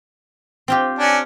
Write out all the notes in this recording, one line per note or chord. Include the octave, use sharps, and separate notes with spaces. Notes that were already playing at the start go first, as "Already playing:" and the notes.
C4 F4 G4
C#4 D4